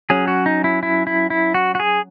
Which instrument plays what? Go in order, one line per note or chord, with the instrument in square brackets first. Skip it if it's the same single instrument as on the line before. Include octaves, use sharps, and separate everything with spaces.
[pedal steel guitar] F#3 C#4 G#4
F#4
D#4
E4
E4
E4
E4
F#4
F#4
G#4